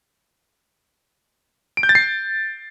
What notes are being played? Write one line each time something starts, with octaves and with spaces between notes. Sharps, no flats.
D7
G6
A6
C7